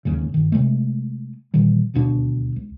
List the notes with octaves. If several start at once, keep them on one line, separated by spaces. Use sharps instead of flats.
D1 D#2 G#2 C#3
G2 D#3
C3 D#3 G#3 A3
A#2 D#3 E3 G3
D#1 D2 B2 D4
C#2